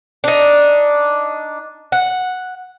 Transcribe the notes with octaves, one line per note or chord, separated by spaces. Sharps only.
D4 D#4
F#5